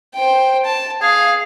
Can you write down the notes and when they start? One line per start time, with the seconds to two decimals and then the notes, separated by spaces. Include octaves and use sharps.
0.15 C5 G5
0.65 A5
1.02 G#4 F5